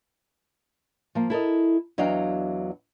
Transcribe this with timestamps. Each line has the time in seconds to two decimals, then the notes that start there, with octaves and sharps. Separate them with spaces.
1.15 F3 A#3
1.30 E4 A4 A#4 D#5
1.98 E2 F#3 D4 D#5 F5 G5